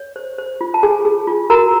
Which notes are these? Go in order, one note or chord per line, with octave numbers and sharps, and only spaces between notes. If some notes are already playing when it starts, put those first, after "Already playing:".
Already playing: C#5
C5
C5
F4
A5
G#4 G#5
G#4
F4
F#4 A#4 A#5